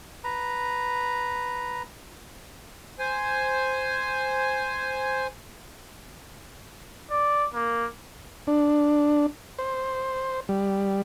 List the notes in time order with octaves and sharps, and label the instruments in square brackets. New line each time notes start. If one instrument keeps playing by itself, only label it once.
[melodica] B4 A#5
[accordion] C5 G#5
[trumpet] D5
A#3
[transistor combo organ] D4
C5
G3